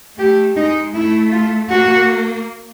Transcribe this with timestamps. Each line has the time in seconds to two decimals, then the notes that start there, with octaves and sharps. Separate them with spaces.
0.18 A3 G4
0.56 G#3 D#4
0.94 A3 E4
1.32 F4
1.70 A#3 F#4